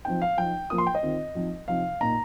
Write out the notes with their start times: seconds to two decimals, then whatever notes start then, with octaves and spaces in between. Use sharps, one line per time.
0.05 F3 C4 D#4 G5
0.22 F5
0.37 F3 D#4 G5
0.70 F3 A#3 F4 D#6
0.78 C6
0.87 G5
0.95 D#5
1.03 D#3 C4 F4
1.35 F3 C4 D#4
1.68 C3 F3 D#4 F5
2.01 A#2 A#3 D#4 A#5